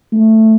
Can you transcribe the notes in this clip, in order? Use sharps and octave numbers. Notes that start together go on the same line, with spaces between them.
A3